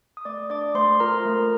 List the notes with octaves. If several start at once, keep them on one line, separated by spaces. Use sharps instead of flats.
D#6
A3 D5 D6
D4 D5 D6
A3 C5 C6
F4 A#4 A#5
A3